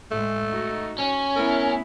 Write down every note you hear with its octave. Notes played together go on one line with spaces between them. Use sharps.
A2 G#3 A3
D#4 F#4
C#4
A3 B3 E4 A#4